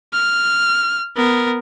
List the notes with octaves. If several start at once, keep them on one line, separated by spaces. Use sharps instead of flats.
F6
B3 A#4